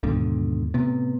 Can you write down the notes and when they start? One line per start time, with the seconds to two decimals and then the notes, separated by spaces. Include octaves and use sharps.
0.03 D#2 G#2 B2 D3
0.74 A2 C3 B3